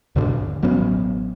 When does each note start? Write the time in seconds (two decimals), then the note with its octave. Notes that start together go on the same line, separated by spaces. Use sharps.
0.16 D#2 G#2 B2 D3
0.62 A1 F#3 B3 C#4